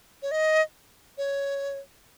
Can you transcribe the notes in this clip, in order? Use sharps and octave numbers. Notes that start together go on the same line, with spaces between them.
C#5
D#5
C#5